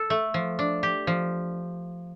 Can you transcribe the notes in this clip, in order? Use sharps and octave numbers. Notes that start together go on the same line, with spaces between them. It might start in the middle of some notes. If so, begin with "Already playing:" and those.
Already playing: A4
A3
F3
D4
G4
F3